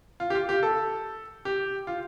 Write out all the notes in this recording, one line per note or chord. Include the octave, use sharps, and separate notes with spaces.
F4
G4
F4
G4
A4
G4
F4